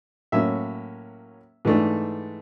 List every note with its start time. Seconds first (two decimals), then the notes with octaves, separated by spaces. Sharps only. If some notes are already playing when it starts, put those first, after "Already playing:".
0.32 A2 F#3 A#3 C#4 E5
1.65 G#2 E3 A3 D4